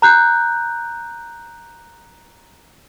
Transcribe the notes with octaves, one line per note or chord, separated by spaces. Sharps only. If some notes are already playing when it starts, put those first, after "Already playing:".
A#5 F#6 G6